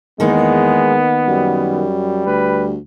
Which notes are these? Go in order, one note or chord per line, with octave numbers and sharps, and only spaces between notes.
E2 D#3 G#3 A#3 B3 D#4
F#2 G3
D2 B4